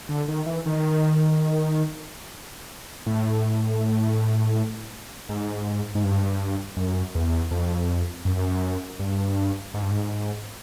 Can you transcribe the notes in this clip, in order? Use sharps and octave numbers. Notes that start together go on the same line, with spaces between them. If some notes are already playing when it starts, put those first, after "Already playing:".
D3
D#3
E3
D#3
A2
G#2
G#2
G2
F#2
E2
F2
F#2
G2
G#2
G2
G#2